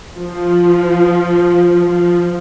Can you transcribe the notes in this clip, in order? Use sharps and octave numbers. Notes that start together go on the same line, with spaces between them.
F3
F3